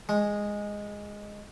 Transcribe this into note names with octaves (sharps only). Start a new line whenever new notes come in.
G#3